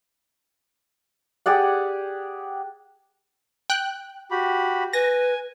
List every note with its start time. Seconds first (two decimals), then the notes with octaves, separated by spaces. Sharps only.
1.46 G4 G#4 D5 F#5
3.70 G5 F#6
4.31 F#4 G4 B5
4.93 B4 G#5 A#6